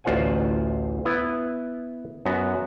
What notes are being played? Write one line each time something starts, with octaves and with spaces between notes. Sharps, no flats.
A1 D2 F4 C5 F#5 G#5
B3 E4 B4
F#2 B3 F#4